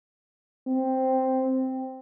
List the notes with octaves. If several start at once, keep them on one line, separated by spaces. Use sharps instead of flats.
C4